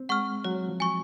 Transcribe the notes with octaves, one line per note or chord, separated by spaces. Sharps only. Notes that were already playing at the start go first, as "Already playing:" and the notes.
Already playing: C4
G#3 F#5 C#6 F6
F#3 C#5
F3
G#5 C#6